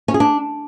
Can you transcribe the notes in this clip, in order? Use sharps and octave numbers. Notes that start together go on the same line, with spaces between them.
C#4
G#4
D4